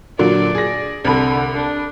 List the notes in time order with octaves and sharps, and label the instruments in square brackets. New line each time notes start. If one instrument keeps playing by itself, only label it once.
[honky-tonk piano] A#2 D3 F#3 [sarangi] D5
[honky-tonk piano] G#4 A#6
[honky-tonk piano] C2 B5 [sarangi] D3
[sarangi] D4